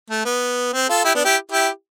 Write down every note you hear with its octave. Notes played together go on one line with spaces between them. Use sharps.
A3
B3
C4
F4 A4
E4 G4
B3 D4
E4 G4
E4 G4